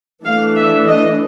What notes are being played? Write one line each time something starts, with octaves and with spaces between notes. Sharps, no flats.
E3 A3 D4 F5
E5
D#5